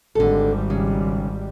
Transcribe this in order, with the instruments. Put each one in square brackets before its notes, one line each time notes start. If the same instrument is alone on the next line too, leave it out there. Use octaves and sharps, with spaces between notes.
[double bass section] G#1 G3 [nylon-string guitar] D3 A4
[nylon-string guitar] C#3